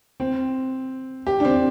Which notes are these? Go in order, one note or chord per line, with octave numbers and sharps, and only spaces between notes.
C4
G4
D4
C4